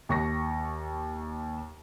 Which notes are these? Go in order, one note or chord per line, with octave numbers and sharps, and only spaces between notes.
D#2 C#6 A#6